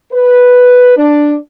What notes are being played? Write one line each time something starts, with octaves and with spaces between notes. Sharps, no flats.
B4
D4